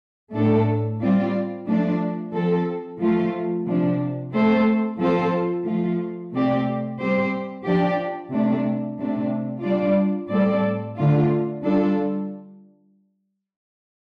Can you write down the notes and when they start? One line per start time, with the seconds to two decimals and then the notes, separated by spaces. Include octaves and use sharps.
0.34 A2 A3 D4 A4
1.01 G3 C4 F4 D5
1.67 F3 A3 D4
2.34 F3 C4 A4
3.00 F3 A3 F4
3.67 C3 F3 D4
4.33 A3 C4 A4 C5
4.99 F3 C4 F4 A4 C5
5.66 F3 A3 F4
6.33 C3 A3 C4 G4 D5
6.98 G3 C4 G4 C5
7.65 F3 D4 G4 D5
8.31 C3 A3 D4
8.98 C3 A3 D4
9.64 G3 D4 F4 D5
10.30 A2 G3 C4 A4 D5
10.97 D3 A3 D4 F4
11.64 G3 D4 F4 A4